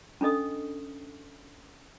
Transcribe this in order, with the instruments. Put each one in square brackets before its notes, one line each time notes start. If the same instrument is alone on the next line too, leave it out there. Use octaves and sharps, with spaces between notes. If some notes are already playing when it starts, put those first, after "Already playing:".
[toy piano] C#4 D4 A4 D#5 D#6